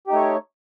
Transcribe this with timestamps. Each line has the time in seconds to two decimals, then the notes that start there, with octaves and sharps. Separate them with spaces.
0.07 G4
0.10 D#4
0.13 A3
0.16 C#5